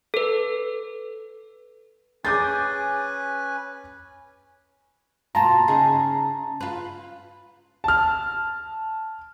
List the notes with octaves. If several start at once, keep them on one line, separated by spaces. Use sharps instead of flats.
A4 B4
C#4 G#4 B4 G#5 D6 G6 A6
B2 A#3 F4 A5 A#5
C#3 D#4 G#4
F4 B4
A5 F6